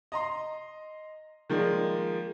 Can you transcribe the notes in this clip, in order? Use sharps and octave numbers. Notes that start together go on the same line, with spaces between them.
D#5 A#5 C6
D#3 F3 G#3 A#3 D5